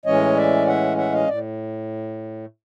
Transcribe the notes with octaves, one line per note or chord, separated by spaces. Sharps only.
A2 E3 G#3 C#4 C#5 D#5
D5 E5
E5 F#5
E5 F#5
D#5 F5
A2 D5